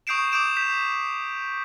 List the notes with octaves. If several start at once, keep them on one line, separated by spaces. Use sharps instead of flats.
C#6 D#6 G6 C7 D7 E7
D6 D#6 G6 D7 E7
G6 B6